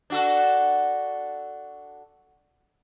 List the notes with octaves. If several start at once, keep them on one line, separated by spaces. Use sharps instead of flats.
D4 F#4 A4